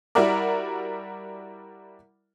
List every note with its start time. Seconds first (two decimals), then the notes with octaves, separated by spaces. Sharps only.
0.15 G3 E4 F#4 A#4 D5